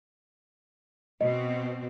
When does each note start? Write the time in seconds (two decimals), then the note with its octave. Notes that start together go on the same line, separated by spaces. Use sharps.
1.21 B2 C4 D#5